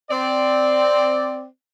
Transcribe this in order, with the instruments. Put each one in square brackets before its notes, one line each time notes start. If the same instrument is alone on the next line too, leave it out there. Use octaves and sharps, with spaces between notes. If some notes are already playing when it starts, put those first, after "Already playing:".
[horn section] C4 D5